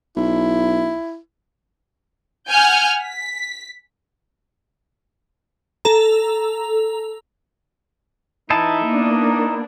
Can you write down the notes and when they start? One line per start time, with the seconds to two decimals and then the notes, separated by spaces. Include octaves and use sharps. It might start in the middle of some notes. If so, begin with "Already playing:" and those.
0.17 B1 E4
2.50 F#5 G#5 F6 G6
3.02 B6
5.85 A4 A#5
8.50 E3 D#4 E4 A5
8.86 A#3 B3 D4